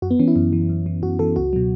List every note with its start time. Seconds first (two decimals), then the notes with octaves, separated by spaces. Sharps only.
0.02 F#2 F#4
0.11 B3
0.19 E3 C#4
0.28 E4
0.36 F#2
0.53 E3
0.69 F#2
0.86 E3
1.03 F#2 F#4
1.19 E3 A4
1.36 C#2 F#4
1.53 B2 F#3